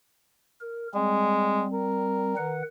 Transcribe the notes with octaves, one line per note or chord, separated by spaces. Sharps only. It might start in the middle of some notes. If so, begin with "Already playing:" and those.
A#4
G3 G#3 C4
A#4
D#3 B4 F#5